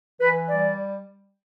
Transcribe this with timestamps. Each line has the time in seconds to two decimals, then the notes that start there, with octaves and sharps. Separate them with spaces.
0.20 E3 B4
0.49 G3 D5